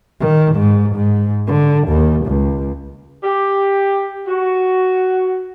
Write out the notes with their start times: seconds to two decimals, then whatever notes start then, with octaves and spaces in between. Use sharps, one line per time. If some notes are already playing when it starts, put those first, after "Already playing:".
0.20 D#3
0.56 G#2
0.95 G#2
1.47 D3
1.88 D#2
2.26 C#2
3.23 G4
4.27 F#4